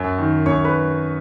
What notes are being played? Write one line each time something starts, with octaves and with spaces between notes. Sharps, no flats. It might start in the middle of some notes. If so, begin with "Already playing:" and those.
Already playing: F#2
D#3
F#2 C#5 C#6
B4 B5